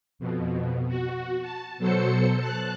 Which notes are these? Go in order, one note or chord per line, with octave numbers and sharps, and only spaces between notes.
F2 B2
F#4
A5
B2 F#3 A4 C5 C#7
A5 F#6